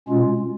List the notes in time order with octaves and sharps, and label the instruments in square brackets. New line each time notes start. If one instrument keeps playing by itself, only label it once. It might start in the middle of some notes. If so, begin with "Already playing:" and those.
[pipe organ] B2 G#3 C#4 F4